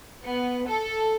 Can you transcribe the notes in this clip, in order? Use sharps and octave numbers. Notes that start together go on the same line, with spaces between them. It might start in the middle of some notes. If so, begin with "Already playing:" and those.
B3
A4